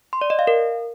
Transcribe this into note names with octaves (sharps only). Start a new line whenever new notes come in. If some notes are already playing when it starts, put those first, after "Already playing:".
C6
D5
D#5
F5
A#4